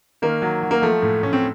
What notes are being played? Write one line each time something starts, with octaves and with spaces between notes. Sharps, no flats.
D#3 A#3
F#3
F#3
A#3
F3 A3
A2
A2 C#4
C4